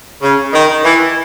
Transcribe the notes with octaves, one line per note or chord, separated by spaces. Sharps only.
C#3
D#3
E3